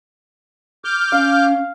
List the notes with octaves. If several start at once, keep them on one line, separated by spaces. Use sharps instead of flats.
D6 F6 G6
C#4 F5